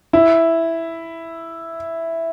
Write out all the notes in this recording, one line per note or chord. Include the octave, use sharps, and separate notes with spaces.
E4